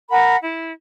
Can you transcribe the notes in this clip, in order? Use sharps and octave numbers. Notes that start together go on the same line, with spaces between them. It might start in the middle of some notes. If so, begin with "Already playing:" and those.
A#4 F#5 B5
E4